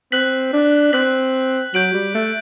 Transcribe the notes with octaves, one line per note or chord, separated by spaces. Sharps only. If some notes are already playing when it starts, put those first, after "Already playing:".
C4 F#6 B6 F#7
D4
C4 F#6 B6 F#7
F#3 G6 D7 F#7
G3
A3